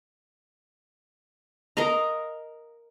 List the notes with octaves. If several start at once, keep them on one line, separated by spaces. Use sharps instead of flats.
A#4 D#5 F5 A#5